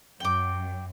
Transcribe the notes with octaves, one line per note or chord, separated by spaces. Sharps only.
F#2 G5 D6